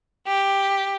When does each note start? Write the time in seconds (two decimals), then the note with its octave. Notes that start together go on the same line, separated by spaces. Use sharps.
0.27 G4